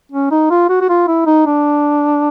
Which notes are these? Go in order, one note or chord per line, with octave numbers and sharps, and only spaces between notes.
C#4
D#4
F4
F#4
F#4
F4
E4
D#4
D4